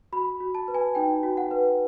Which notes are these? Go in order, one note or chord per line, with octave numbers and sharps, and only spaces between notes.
F#4 B5
F#4
A5
B4
G#5
D#4 G5
F#4
F#5
B4